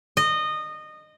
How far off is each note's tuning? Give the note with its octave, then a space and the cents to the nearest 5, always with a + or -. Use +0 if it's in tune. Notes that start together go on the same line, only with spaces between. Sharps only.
D#5 -20